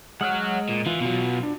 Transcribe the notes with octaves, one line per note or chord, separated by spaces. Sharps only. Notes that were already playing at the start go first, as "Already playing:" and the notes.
G#3 C#5 F#5 F6 F#6
A#2
E3 F4
B2 F#3
D4